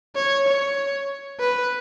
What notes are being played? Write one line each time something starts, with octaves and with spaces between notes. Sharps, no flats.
C#5
C#5
B4